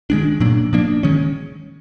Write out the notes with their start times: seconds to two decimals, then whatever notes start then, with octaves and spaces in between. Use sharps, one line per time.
0.10 D#3 G#3 B3 D4
0.40 A#2 F#3 A#3 D4
0.73 F3 A#3 D4
1.03 D#3 G#3 C#4